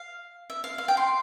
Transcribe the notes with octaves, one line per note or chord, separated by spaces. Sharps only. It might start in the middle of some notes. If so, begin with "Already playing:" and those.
Already playing: F5
E5
F5
F5
G5
C6